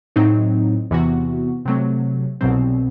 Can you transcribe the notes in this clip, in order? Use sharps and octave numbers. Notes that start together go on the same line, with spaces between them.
A2 F#3 C4 D#4
E2 C3 E3 B3 F#4
C3 F#3 A3 C4
C2 B2 F#3 C4